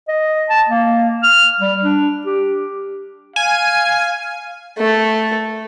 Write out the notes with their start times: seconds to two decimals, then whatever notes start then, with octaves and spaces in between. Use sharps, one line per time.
0.08 D#5
0.50 A5
0.69 A#3
1.23 F6
1.60 G3
1.83 D4
2.26 G4
3.36 F5 G#5
4.78 A3